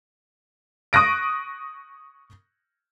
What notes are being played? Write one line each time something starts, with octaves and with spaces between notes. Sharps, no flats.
C#6 D#6 F#6 A#6 D7